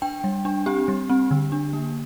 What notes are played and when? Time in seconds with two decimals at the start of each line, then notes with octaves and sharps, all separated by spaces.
0.02 D4 G5
0.24 G3
0.45 D4
0.66 C4 G4
0.88 G3
1.10 C4
1.31 D3
1.52 D4
1.73 A#3